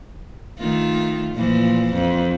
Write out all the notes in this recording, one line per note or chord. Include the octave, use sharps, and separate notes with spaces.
D#3 A3 F4
A#2 E3 F3
F2